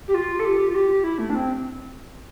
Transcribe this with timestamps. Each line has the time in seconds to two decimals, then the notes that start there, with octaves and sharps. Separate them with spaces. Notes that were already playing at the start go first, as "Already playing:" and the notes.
0.08 G4
0.14 F4
0.40 A4
0.45 G4
0.70 F4
0.75 G4
1.04 E4
1.19 A3
1.30 D4
1.35 C4